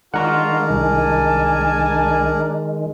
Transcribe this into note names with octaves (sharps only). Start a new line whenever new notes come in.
D#3 G#3 D4 F4 A#4 F#5 A#5 C#6
C2 G#5 A5